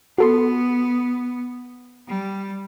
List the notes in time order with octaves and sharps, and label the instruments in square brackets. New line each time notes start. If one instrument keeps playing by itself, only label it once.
[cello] B3 [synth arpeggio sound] F#4 A4 C6
[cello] G3